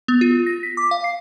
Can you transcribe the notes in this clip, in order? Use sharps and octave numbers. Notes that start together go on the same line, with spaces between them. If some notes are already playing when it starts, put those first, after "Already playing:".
B3
F4
A#6
B6
D6
F5
C7